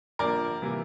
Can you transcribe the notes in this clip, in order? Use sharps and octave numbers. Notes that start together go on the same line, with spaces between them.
G1 G2 F3 A#3 A#4 D5
C3 E3 G3 A#3